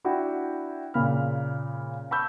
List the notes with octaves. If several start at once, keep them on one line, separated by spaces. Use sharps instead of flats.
D4 E4 F#4 F#5 G5
A#2 C#3 A#3 B5 F6
A5 B5 C#6 E6 G6